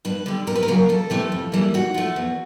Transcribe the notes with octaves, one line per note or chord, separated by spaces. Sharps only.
G2 B4
D3 G3
F2 A#4
B4
A#4
C#3 F#3 A#3
F2 A4
C3 E3 A3
F2
C#3 E3 G3 A#3
G#2 F#4
F3 A3
E2